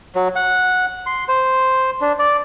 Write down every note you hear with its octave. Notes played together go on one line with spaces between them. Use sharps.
F#3
F#5
C6
C5
D4
D5